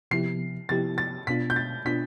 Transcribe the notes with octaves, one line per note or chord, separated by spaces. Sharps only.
C3 F3 B3 E4 G4 C7
C3 F3 B3 E4 G4 A6
A6
B2 B3 D4 F4 B6
G6
A6
B2 B3 D4 F4 B6